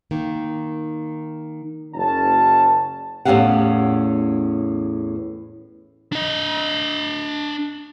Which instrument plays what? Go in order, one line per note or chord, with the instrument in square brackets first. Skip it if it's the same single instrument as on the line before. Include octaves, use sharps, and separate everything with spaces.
[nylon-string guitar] D#3 A#3
[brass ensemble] F#1 C#4 A5
[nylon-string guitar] E2 A2 C#4 G4 F5 F#5
[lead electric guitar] D4 D#5